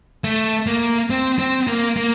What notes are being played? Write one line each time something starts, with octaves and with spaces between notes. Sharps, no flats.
A3
A#3
C4
C4
A#3
A#3